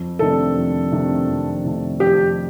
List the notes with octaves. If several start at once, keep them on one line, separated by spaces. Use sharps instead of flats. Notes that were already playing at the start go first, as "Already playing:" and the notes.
Already playing: F2
C3 D#3 A3 D4 A4
F2
C3 D#3 A3 D4
F2
C3 D#3 A3 D4
F2 G4